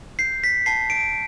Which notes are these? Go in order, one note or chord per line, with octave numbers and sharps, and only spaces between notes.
G6 C7
B6
A5 C7
D7